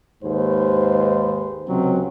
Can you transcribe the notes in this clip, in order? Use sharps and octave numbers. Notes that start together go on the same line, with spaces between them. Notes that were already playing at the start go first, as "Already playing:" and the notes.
D#2 G#2 G#3 B4 C5
C#2 C3 F#3 C4 C#4